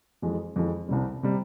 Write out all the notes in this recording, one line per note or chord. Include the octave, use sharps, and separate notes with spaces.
F2 E3 G#3
F2 E3 G#3
C2 C3 G3
C3 G3